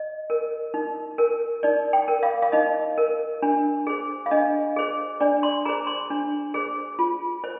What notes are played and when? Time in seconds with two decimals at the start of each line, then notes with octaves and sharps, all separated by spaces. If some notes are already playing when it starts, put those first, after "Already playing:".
Already playing: D#5
0.30 A#4
0.74 D#4
1.18 A#4
1.63 D#4 D5
1.93 G5
2.08 A#4
2.23 F5
2.42 F5
2.52 D#4 D#5
2.98 A#4
3.42 D4
3.87 G#4 C5
4.26 F5
4.31 D4 D#5
4.76 G#4 C5
5.20 D4 D5
5.43 C6
5.65 G#4 C5 A#5
5.87 C6
6.10 D4
6.54 G#4 C5
6.99 F4
7.44 C5